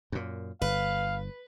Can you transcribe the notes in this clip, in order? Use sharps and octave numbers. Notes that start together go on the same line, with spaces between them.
F#2 A#2
G1 B4 F5